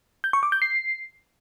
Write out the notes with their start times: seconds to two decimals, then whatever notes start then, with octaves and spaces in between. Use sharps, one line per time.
0.24 G6
0.33 C#6
0.43 D6
0.52 G6
0.62 C7